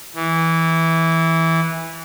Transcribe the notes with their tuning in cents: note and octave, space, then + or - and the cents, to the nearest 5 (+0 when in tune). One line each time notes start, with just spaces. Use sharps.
E3 -10